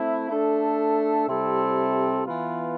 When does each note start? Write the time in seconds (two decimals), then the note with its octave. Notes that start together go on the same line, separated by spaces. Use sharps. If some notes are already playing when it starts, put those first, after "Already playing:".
Already playing: A3 C4 E4
0.29 A3 D4 A4
1.27 C3 G3 C4 E4 A4
2.25 E3 B3 F4